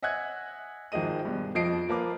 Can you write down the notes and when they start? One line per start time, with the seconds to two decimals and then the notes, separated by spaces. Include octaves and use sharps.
0.02 D#5 E5 F#5 G#5 F#6 G#6
0.92 G#1 D#3 F3 G#3 D#5 D#7
1.25 G2 B2 G#3
1.55 F2 F3 D#5 C7 D7
1.89 F3 A#3 B4 D6